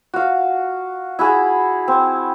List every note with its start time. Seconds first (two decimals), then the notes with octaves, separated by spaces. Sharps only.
0.14 F#4 F5
1.19 E4 F#4 G#4
1.88 C4